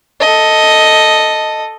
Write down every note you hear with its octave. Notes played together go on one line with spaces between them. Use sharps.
A4 D#5